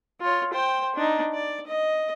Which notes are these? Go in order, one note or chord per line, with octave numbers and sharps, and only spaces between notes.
F4 C#5
C5 G5
D4 D#4
D5
D#5